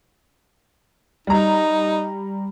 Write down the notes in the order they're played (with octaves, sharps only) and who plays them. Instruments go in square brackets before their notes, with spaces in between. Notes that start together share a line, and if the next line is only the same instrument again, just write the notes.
[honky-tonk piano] G3 A#5 [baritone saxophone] D#4